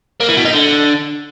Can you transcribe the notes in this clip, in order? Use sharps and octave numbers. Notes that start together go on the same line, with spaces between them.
A#3
E3
B2
D#4
D3